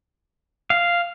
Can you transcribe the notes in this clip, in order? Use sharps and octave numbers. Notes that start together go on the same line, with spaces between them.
F5